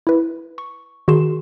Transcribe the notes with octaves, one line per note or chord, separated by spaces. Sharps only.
E4 B4
C#6
D#3 F#4 G#4 A#4 C6 E7